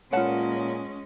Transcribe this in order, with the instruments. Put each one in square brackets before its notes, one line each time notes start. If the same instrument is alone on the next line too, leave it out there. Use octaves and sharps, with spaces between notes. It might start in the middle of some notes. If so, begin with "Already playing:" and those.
[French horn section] A#2 [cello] G#3 C#4 [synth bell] F4 C#5 [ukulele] B4 F#5 A5